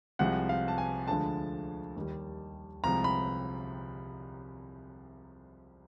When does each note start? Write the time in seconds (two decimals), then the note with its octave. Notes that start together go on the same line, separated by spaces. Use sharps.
0.19 C2 C3 F3 G#3 F#5
0.49 F5
0.68 A5
0.78 G#5
1.07 D2 D3 F3 G#3 A5
1.96 D#2 D#3 G3
2.84 C2 C3 F3 G#3 A#5
3.04 B5